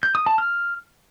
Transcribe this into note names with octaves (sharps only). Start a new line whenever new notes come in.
G6
D#6
A5
F6